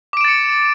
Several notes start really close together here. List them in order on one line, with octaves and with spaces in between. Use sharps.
D6 D7 E7 A6 C#7